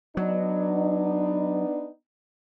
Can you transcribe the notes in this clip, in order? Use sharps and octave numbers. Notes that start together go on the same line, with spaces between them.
F#3 B3 D4 D#4